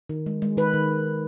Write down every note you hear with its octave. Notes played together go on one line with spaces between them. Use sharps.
D#3
G#3
G#3
D#3 B4
D#3